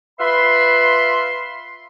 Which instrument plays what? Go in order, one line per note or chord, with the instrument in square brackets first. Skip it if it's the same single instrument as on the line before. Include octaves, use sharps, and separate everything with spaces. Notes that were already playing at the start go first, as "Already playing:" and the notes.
[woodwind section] F4 B4 E5 B5 C6